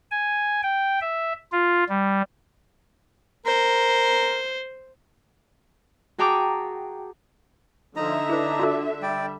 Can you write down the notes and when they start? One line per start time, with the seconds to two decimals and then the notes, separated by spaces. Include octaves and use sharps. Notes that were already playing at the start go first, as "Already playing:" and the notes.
0.11 G#5
0.63 G5
1.01 E5
1.52 F4
1.89 G3
3.46 A#4 C5
6.18 F#4 G#4 G5 A5 A#5 D6
7.96 D3 F3 D#4 E5 A#5
8.30 D4 E4 B4
8.59 F4 F#4 A4
9.02 G3 D5 G5